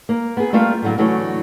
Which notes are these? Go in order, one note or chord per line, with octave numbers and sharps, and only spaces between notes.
A#3
B3 G#4
G3 A3 A#3 F4
A2 D3 F#3
D3 E3 F#3 A3